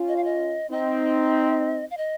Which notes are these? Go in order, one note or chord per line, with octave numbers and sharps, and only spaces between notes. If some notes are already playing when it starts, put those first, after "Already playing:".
Already playing: C#4 F4
D#5
F5
D#5
C4 D#4 D#5
F5
D#5